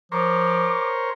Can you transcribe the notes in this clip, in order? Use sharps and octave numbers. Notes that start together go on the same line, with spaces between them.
F3 A#4 C5 C#5 D6